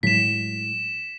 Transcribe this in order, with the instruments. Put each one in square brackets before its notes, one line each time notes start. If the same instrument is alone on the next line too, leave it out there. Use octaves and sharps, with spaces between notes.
[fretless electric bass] A2 F#3 G#3 [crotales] B6 E7